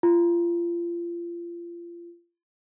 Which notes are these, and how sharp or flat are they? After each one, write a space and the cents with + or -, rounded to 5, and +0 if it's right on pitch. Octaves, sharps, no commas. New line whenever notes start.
F4 -30